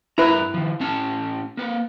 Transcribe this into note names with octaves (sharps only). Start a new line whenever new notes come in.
G2 E4 A#4 B4 A#5
D#3 F3
A2 C#4 A5
A#3 B4